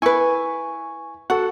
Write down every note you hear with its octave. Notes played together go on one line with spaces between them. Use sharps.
E4 B4 G#5 C#6
F#4 A4 F#5